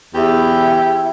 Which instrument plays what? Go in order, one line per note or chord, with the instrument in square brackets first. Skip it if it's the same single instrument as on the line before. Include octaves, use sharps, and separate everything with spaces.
[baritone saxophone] E2 [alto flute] E4 [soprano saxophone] G4